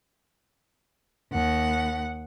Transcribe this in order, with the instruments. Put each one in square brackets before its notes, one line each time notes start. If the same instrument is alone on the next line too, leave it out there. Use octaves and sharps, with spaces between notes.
[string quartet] D#2 F#5